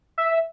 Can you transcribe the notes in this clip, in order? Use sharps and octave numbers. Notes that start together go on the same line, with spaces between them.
E5